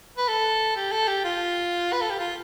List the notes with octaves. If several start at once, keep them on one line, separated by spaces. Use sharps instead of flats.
B4
A4
G4
A4
G4
F4
B4
A4
G4
F4